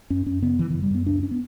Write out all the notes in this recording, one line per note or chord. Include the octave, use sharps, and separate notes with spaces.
F#2 C#4
F#2 C#4
C#3 B3
C#3 E3
F#2 E3
G3
F#2 B3
C#2 D4
C#4
B3